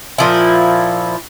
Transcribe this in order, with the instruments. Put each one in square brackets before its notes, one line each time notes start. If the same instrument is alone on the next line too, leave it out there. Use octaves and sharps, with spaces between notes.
[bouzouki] A#2 F3 E4